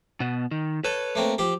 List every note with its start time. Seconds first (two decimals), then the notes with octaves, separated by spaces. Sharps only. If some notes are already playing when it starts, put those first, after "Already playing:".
0.20 B2 B3
0.51 D#3
0.84 A4 B4 C#5
1.15 A3 A#3 C4
1.38 F3 G4